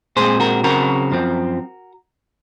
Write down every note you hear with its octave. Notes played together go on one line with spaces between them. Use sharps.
A#2 G#3 C4 G#4 C5
F#4 A#4
C#3 F#3 C4 F#4 A#4
F#2 F3 C4